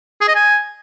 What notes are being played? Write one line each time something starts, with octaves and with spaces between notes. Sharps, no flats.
G#4
D#5
G#5